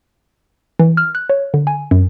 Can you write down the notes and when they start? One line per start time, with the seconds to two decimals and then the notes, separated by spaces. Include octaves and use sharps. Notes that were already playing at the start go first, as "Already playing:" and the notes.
0.79 E3
0.97 F6
1.15 F#6
1.29 C#5
1.54 D3
1.67 G#5
1.91 F#2